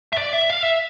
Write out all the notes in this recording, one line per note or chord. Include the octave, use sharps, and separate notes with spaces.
E5
D5
E5
F5
E5